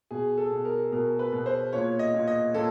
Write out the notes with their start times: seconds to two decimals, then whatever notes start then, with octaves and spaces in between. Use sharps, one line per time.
0.11 B2 G#4
0.38 A4
0.51 B2
0.65 A#4
0.92 B2 A#4
1.19 B4
1.32 B2
1.46 C5
1.73 A#2 C#5
1.99 D#5
2.14 A#2
2.28 D#5
2.54 A#2 A4